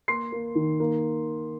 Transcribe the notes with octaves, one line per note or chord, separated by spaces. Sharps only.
A#3 C6 C7
A#3
D#3
A#3